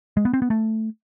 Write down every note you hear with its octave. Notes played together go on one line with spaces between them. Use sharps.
G#3
B3
C4
B3
A3